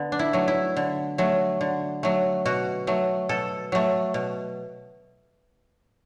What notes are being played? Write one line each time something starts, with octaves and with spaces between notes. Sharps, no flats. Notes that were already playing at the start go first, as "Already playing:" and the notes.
Already playing: D3 B3
D4
E4
F#3 A3
E4
D3
F#3 A3
D3
F#3 A3
B2 F#4
F#3 A3
B2 A4
F#3 A3
B2